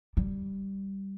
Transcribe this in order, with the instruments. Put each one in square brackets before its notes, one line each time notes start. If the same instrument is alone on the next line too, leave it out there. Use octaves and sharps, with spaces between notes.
[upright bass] G3